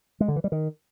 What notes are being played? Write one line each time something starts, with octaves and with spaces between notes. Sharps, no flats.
G#3
D3
E3
G3
D#3